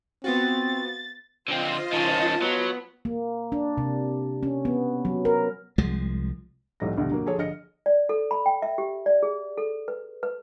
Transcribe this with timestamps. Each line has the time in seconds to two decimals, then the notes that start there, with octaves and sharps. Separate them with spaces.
0.24 B3 C4 F4 F#4 A6
1.48 D3 C4 F4 C5 D#5
1.93 D#3 C#4 A5
2.42 F#3 B3
3.05 A#3
3.52 D4
3.78 C3
4.43 C#4
4.65 B3
5.05 F#3
5.25 A#4
5.78 C2 F3 G#3
6.80 C2 F2 A2 D#4 E4 A#6
6.98 D2 B2 E3 G3
7.10 D3 F#3 A#3
7.26 F3 G#4 A4 C#5
7.38 A#1 D3 D#5 F6 A#6 C#7
7.86 D5
8.09 A4
8.31 B5
8.46 G5
8.62 E5
8.78 G4
9.06 D5
9.23 G#4
9.58 A4
9.88 B4
10.23 B4